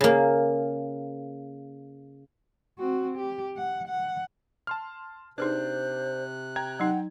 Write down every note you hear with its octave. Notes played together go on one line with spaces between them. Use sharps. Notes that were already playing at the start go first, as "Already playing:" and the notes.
C#3 A#3
C4 F#4
G4
F#5
F#5
A5 C6 F6
C3 D4 D#4 G#4 B4 C5 F#6
G5 A#5 G#6
F#3 D#4 F#5